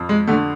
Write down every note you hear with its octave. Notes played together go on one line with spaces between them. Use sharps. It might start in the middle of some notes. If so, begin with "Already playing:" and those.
Already playing: F2
G#3
D3 A3